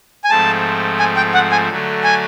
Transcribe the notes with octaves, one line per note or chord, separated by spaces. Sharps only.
G#5
G#2 F3 A3 C4 A5
G#5
G5
F#5
G#5
D3 F#3 A3
G#5